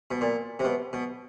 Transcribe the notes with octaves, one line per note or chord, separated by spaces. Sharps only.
B2
A#2
C3
B2
B2